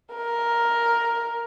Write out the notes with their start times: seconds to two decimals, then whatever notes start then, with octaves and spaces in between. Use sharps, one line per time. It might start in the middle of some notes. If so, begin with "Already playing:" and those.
0.14 A#4